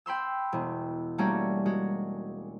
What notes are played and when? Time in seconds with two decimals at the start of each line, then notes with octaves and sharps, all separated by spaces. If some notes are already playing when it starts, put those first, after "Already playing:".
0.06 G5 B5 C6 E6
0.52 E1
1.18 G3 A3 A#3 C#4 D4 F#4
1.66 G#3 F#4